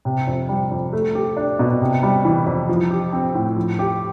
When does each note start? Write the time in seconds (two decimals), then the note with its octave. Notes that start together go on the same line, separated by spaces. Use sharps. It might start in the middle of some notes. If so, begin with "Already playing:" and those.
0.05 C3
0.27 F2
0.49 G3
0.71 F2
0.93 A3
1.15 G4
1.37 D4
1.59 B2
1.81 C3
2.03 G3
2.25 E3
2.46 F2
2.69 F3
2.91 G4
3.12 C4
3.35 A2
3.57 F3
3.79 G4